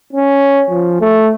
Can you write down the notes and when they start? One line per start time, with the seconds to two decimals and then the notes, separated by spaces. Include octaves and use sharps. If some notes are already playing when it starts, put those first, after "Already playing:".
0.13 C#4
0.70 F3
1.00 A3